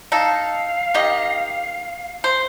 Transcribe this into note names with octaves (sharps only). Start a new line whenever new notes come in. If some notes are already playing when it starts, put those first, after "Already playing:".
D#4 A4 F5
D#3 G4 D#5
C5